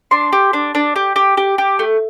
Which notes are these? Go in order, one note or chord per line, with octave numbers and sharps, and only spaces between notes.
D4 C6
G4
D4
D4
G4
G4
G4
G4
A3